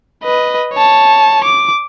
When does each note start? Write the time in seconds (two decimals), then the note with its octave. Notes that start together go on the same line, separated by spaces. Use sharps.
0.24 B4 D#5
0.73 C#5 A5
1.44 D6